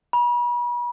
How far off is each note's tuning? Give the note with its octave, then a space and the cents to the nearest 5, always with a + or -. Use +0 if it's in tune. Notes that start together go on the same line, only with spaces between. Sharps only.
B5 -40